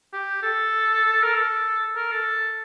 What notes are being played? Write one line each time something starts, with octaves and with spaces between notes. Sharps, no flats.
G4
A4
A#4
A4
A#4
A4